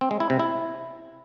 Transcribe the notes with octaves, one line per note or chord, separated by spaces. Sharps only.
C4
G#3
E4
C3
E4